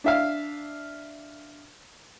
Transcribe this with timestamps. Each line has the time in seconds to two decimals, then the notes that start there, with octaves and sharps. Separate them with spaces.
0.04 D4 E5 F5